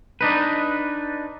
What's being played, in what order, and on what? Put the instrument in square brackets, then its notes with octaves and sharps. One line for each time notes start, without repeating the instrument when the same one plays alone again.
[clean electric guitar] D4 D#4 B4